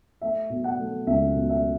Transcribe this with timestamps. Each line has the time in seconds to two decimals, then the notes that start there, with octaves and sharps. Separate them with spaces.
0.21 A3 E5
0.50 B2
0.64 F#5
0.79 A3
1.07 C#2 E5
1.35 B2
1.50 E5